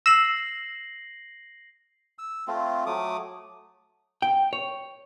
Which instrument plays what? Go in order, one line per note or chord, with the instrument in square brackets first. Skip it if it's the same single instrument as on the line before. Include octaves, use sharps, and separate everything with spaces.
[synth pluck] E6 [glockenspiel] A#6 C7 F#7
[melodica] E6
A3 C4 F4
F#3 A3 D6 D#6
[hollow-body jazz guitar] G5
C#5